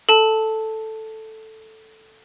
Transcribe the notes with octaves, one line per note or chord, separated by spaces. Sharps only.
A4 A5